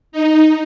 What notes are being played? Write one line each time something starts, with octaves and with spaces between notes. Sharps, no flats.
D#4